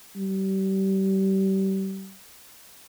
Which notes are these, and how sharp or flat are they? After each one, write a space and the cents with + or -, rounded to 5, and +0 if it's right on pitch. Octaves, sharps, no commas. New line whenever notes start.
G3 -30